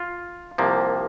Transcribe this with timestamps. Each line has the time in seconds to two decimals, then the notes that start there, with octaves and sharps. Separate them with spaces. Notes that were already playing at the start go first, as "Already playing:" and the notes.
Already playing: F4
0.58 C2 C3 F3 A#3